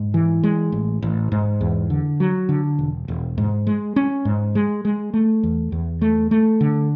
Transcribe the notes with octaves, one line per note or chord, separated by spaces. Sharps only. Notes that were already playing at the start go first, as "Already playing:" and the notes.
Already playing: G#2
E3
G#3
A1
A1
G#2
E2
D3
F#3
D3
E1
E1
G#2
G#3
C#4
G#2
G#3
G#3
A3
E2
E2
A3
A3
D3